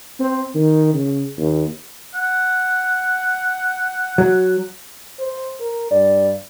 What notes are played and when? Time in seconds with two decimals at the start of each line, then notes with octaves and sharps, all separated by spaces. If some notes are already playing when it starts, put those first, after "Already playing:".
0.20 C4
0.55 D#3
0.94 C#3
1.37 D#2
2.14 F#5
4.18 F#3
5.19 C5
5.60 A#4
5.91 G2 D5